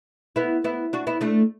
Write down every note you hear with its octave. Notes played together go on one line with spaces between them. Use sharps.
B3 E4
B3 E4
D4 F#4
B3 E4
A3 D4